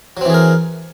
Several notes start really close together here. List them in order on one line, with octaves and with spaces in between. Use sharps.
F#3 C4 E3 G#4 A#4